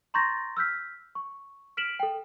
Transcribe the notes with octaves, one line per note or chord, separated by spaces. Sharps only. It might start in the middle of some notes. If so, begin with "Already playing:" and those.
A#5 C6 C#6 G6 A6 A#6
E6 F6 G6 B6
C#6
F6 B6 D7 E7 F#7
A4 G5